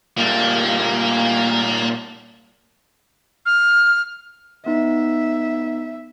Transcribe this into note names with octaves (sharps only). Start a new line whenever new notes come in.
A#2 G3 A3 A#3
F6
B3 D#4 E5